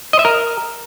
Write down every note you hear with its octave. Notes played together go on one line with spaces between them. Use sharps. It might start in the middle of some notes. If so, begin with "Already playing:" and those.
D#5
E5
A#4